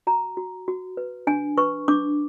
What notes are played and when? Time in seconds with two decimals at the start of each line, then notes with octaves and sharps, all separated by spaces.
0.07 F#4 A#5
0.37 F#4
0.68 F#4
0.97 B4
1.27 D4 G#5
1.57 B4 C#6
1.88 D4 D6